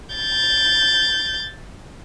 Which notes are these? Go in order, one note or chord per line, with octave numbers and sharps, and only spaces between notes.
G6 A6